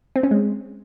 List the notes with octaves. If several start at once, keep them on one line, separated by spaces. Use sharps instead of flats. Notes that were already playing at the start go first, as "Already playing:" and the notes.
C4
C#4
G#3